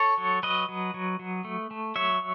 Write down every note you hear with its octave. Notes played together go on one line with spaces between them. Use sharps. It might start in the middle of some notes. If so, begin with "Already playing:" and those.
Already playing: A4 C#5
F#3
F#3 B4 D#5
F#3
F#3
F#3
A3
A3
F#3 C#5 E5